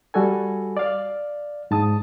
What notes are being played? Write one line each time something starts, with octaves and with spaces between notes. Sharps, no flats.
G3 F#4 A4 G#5
D5 F5
G#2 A5 D#6